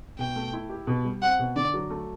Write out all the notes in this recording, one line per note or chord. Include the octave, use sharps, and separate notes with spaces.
B2 G5
A3
E4
G4
B2
G3
C4 F#5
B2
D3 D5
F#3
A3